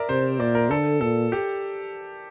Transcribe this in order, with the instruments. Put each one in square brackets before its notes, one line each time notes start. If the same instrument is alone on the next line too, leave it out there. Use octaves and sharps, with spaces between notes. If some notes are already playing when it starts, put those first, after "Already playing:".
Already playing: [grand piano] A#4 D5 E5
[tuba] C3 [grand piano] C5
[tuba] A#2 [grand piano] D5
[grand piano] A#4
[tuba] D3 [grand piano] A4
[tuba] A#2 [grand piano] A4
[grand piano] G4